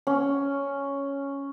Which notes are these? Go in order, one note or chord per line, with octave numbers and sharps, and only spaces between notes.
C#4